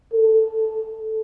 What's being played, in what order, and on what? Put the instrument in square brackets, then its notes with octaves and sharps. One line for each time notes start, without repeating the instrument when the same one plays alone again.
[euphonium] A4